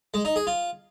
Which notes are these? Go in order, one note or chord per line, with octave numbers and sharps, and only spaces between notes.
G#3
D#4
G#4
F4